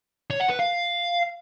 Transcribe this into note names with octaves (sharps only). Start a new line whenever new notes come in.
C#5
F#5
B4
F5